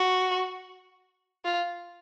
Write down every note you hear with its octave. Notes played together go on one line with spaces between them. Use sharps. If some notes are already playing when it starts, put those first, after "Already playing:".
Already playing: F#4
F4